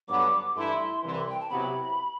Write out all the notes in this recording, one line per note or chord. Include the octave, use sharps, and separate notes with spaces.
G2 D3 F#3 B3 D6
G2 E3 A3 E4 C6
C2 C3 E3
G5
A5
C3 F#3 B3 E4 G4 B5